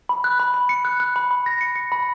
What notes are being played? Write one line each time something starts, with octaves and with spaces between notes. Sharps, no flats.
B5
F#6
B5
B5
C#7
F#6
F#6
B5
B5
A#6
C#7
C#7
B5